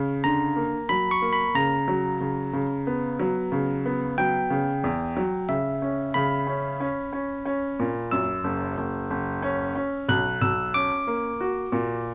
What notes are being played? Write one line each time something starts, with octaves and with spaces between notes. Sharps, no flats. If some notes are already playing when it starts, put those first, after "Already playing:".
Already playing: C#3
D3 A#5
A#3
F#3 B5
C#6
A#3
B5
C#3 A#5
F#3
C#3
C#3
B3
F#3
C#3
B3
F#3 G5
C#3
E2
F#3
C#3 E5
C#4
C#3 B5
C#4
C#4
C#4
C#4
A#2
F#2 E6
F#1
F#1
F#1
C#4
C#4
B1 F#6
B1 E6
C#4 D6
A#3
F#4
A#2